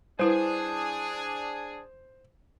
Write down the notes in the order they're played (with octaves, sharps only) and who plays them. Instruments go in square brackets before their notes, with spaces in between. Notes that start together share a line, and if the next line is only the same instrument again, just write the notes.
[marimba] G3 E4 B4 [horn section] D4 G#4 [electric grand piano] C5